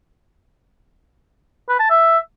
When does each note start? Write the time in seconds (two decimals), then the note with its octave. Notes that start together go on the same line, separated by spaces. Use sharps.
1.69 B4
1.80 A5
1.90 E5